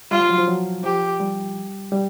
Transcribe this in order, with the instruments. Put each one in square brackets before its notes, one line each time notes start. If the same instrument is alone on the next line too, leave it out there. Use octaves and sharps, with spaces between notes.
[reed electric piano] G3 [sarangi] F4
[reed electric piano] F3
F#3
F3
F#3
[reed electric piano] F3 [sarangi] G4
[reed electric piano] G3
G3